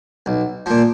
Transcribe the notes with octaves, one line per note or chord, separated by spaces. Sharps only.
B1
A#2 F3